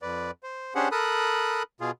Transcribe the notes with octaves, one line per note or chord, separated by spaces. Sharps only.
F2 B4 D5
C5
C#4 D4 G4 G#4 C5 F#5
A4 A#4 B5 D#6 F#6
B2 F4 G#4